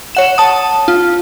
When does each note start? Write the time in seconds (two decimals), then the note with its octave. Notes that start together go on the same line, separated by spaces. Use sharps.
0.15 C#5 F#5 E7
0.38 A5 D#6
0.88 F4